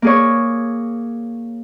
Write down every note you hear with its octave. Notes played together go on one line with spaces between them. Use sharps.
A#3 G#4 C#5